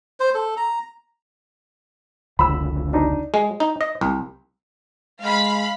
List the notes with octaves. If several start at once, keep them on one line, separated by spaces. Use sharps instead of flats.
C5
A4
A#5
F1 C#2 D3 B5 E6
D4 D#4
G#3
D#4
D#5
C2
G#3 F5 B5